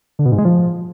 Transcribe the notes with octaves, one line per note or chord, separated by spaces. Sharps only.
D3
B2
G#2
G#3
F3